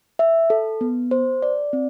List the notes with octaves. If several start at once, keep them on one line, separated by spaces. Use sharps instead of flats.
E5
A4
B3
C5
D5
C4